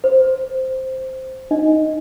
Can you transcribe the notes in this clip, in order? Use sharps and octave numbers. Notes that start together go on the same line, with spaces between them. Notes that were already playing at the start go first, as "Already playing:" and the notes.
C5
D#4 D#5